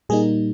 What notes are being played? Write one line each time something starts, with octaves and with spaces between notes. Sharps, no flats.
A#2 G3 A#3 D#4 G#4